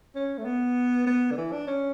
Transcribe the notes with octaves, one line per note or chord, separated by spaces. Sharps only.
C#4
A3
B3
B3
D3
E3
D4
C#4